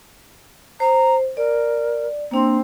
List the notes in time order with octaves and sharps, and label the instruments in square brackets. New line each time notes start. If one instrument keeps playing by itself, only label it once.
[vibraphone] C5 [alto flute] A#5
[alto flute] A#4 [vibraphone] D5
[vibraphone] A#3 D4 C6 [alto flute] C4